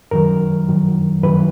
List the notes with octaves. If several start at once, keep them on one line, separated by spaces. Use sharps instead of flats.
F#2 D#3 F#3 A#4
F#2 D#3 F#3
F#2 D#3 F#3 B4